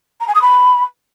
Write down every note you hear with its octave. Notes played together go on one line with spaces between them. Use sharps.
A#5
G#5
D#6
B5